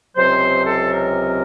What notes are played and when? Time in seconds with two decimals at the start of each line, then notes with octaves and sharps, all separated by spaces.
0.16 C#2 C3 F#3 C4 C5
0.66 A4
0.90 A#4